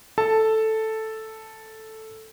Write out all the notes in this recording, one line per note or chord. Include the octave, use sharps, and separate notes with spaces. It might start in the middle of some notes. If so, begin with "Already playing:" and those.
A4 A5